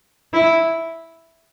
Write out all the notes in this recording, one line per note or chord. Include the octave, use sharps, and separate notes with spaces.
E4